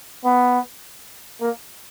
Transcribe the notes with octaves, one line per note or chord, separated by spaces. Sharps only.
B3
A#3